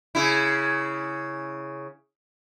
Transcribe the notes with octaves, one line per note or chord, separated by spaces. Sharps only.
C#3 E4